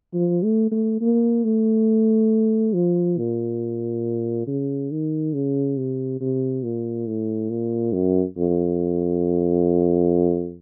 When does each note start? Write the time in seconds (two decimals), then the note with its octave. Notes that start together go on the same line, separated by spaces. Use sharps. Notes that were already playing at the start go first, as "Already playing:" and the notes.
0.14 F3
0.43 A3
0.71 A3
1.01 A#3
1.44 A3
2.74 F3
3.18 A#2
4.47 C#3
4.91 D#3
5.34 C#3
5.77 C3
6.21 C3
6.64 A#2
7.08 A2
7.50 A#2
7.93 F#2
8.37 F2